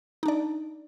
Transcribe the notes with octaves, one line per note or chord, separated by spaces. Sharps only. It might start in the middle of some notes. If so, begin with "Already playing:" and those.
D4 D#4 D5